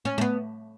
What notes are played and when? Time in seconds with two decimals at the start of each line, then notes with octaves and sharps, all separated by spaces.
0.05 C#4
0.18 A3
0.21 B3